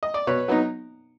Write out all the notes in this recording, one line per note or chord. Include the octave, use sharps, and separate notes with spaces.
D#5
D5
B2 B4 C#5
F#3 B3 D#4